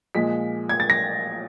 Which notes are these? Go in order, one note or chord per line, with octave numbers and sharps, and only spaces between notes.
A#2 F3 G#3 B6
G#6
A6
A#6